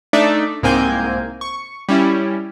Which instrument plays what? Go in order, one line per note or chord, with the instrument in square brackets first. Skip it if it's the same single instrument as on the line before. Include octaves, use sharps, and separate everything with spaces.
[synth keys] A3 D4 D#4 D5 E5
C2 G#2 A#3 C4 G#5 G6
C#6
G3 C#4 E4